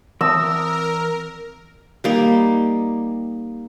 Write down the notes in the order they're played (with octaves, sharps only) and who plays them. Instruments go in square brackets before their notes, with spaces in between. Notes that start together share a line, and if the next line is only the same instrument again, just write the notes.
[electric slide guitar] E3 C4 D5 [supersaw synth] A#4 [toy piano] E5 A5 D#6 [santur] E6
[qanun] G3 A#3 D#4